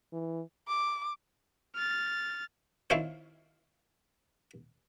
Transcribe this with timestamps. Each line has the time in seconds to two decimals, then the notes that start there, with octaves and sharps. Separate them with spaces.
0.13 E3
0.68 D6
1.75 F6 A6
2.90 D#3 C4 E4 F4 C5 C#5